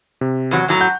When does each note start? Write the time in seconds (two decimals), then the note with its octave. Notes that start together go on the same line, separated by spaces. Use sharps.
0.21 C3
0.51 E2 F#3
0.68 F#2 A2 F#3
0.81 F#5 G6